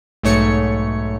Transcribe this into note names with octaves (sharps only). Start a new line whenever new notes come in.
B1 G#2 A3 C#5 C#7